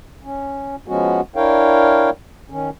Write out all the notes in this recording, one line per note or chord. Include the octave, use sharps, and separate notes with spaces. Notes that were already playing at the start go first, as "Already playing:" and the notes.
C#4
F3 G#3 B3 C#4 F#4
D4 E4 A#4 C#5 F5 G5
D#3 C#4